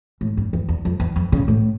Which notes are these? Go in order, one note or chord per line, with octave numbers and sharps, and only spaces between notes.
A2
G2
E2
E2
F2
E2
F2
C#3
A2